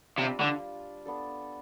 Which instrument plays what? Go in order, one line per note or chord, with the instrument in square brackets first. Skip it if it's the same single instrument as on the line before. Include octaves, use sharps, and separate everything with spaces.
[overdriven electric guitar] C3 [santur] G3 D4 F4 C5
[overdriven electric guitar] D3
[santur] B3 D4 A4